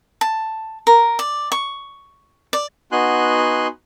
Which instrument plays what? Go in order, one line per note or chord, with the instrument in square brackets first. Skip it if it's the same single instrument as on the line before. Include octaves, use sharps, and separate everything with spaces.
[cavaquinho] A5
A#4
D5
C#6
D5
[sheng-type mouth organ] B3 D#4 F#4 G#5 C6 F#6